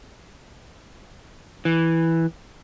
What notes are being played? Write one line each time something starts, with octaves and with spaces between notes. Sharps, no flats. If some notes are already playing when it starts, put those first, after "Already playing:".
E3